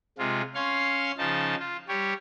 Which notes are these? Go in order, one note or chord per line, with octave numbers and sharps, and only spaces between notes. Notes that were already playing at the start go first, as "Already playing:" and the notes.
C3 G#3 F4
C#4 C#5 F5 C6
C#3 F3 D#4 A5
F4
G3 G4 C#5